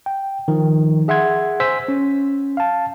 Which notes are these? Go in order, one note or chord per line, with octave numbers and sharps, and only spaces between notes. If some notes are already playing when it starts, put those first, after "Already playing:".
G5
D#3 F3
G#4 E5 F#5 C6 G#6
C5 G#5 E6 B6
C#4
F5 A5